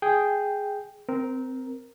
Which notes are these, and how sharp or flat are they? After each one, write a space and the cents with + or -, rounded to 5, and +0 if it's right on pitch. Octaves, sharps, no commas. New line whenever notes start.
G#4 +0 G5 +0
C4 -15 A#4 +5